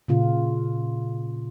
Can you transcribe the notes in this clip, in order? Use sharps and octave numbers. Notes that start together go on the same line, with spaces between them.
A#2 C#3 F4